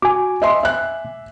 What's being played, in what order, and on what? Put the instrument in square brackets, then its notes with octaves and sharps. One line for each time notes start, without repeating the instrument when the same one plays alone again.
[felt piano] F#4 [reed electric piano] G#5 D6
[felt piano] D#5 E5 C6
E5 F#6